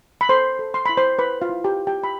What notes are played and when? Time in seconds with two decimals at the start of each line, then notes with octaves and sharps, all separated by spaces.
0.21 B5
0.29 A4 C5 C6
0.59 A4
0.74 C6
0.86 E4 B5
0.97 C5 C6
1.19 E4 B4 B5
1.41 F4 F5
1.50 E4
1.64 G4 G5
1.79 E4
1.87 G4 G5
2.04 B5